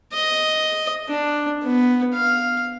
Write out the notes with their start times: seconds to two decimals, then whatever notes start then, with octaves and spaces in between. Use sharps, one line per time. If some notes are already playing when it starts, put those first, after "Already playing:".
0.13 D#5
1.09 D4
1.63 B3
2.14 F5